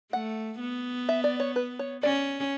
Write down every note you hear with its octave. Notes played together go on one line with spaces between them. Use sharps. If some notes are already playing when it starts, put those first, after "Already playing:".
A3 F#5
B3
E5
D5
C#5
B4
C#5
C#4 D5